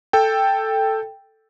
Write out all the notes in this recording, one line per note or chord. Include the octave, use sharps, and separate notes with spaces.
A4 G5